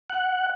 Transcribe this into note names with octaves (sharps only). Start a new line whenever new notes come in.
F#5